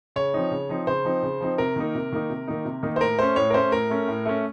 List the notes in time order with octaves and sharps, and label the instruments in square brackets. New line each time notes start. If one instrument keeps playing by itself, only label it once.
[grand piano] C#3 C#5
F3 C4 D#4
C#3
F3 C4 D#4
C#3 C5
F3 C4 D#4
C#3
F3 C4 D#4
C3 A#4
D#3 A#3 D#4
C3
D#3 A#3 D#4
C3
D#3 A#3 D#4
C3
D#3 A#3 D#4
C5
A2 A#4
A3 C#4 C5
A2 C#5
A#4
A3 C#4 C5
A2 A#4
A3 C#4
A2
A3 C#4